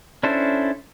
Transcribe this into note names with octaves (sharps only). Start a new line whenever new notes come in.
C#4 D4 E4 A4 C5